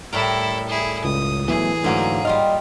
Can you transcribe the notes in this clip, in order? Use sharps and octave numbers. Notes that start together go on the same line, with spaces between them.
A2 G3 E4 A4 A#4
E4 G#4
C#2 D#6
B2 E3 F#3 A3 G#4
G#2 D3 F#3 A3 A#3 F#4
G3 F4 D#5 F5